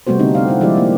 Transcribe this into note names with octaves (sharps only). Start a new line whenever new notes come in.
C3 G3 A3 B3 F#4 C5
D3 C4 D#4
C4 D5 F5
E4 F#5
F3 G#3 E4 G4 D5 E5
A#3